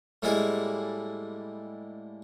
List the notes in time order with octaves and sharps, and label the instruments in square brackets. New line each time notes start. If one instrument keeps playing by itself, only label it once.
[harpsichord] A2 G3 G#3 A#3 E4 G#4